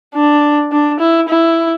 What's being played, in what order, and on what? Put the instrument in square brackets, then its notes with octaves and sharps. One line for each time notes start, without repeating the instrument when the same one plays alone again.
[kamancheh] D4
D4
E4
E4